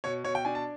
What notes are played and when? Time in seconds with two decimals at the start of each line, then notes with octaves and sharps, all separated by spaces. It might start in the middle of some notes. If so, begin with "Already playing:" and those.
0.04 B2 C#5
0.24 B2 C#5
0.35 G5
0.45 D4 G#5
0.55 A5